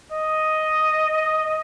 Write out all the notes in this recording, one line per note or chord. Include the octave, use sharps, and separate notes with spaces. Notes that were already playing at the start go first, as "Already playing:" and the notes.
D#5